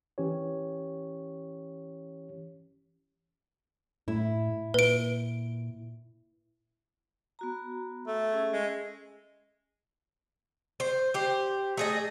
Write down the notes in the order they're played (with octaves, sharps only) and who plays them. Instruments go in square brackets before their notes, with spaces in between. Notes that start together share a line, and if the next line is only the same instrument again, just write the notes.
[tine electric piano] E3 C#4 G4 C#5
[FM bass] A2 [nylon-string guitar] E4
[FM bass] A#2 [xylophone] B4 D7
[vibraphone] B3 F#4 A#5
[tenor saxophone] A3
[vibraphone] C#4 G#4
[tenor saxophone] G#3
[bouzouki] C5
G4 C5
A3 G#4 D#5